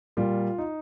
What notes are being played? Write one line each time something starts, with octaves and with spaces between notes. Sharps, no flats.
A#2 G3 F4
D#4